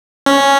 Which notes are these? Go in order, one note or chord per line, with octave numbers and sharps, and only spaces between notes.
C#4